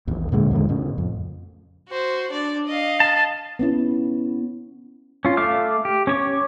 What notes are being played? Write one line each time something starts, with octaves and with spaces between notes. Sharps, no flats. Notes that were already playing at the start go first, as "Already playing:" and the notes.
A1 D#2
A#2 D3 G#3
E2 A2 D3 G#3
A2 C#3
F2
F#4 C5
D4 D5
D#5 F5
A5
B3 C#4 E4
C#4 F4
A3 E5 F5 D6 F6
G4
C#4 C#5 D6